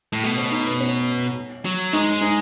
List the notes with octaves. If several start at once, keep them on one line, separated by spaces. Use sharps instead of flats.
A2
B2 A3
C#4
D#4
B3
C#4
F#3
G#3 D#4
D#4